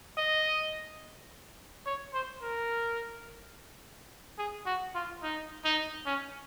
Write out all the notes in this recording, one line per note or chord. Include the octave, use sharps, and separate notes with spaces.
D#5
C#5
C5
A#4
G#4
F#4
F4
D#4
D#4
C#4